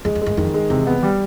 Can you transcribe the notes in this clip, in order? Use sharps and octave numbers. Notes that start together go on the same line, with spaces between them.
F2 G#3
F2
F#2 G#3
F2 D#3
G#3
E2 C3
B3
G3